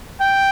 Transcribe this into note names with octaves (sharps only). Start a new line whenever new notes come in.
G5